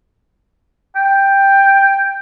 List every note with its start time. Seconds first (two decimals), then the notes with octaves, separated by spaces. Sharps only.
0.96 G5